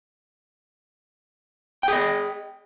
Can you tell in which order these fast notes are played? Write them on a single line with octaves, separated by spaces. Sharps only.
G5 G#4 D#5